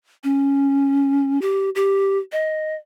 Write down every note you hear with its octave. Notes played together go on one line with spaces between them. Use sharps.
C#4
G4
G4
D#5